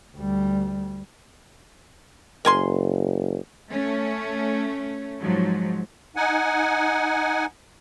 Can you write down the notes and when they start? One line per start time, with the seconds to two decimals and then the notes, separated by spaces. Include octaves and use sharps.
0.16 D2 G3
2.45 F#1 A#4 G#5 C6
3.72 A3 C#4
5.20 G#2 F3 F#3
6.16 D#4 F#5 G#5